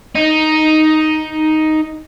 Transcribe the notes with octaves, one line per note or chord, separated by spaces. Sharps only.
D#4